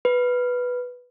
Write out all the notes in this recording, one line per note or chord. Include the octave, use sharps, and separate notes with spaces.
B4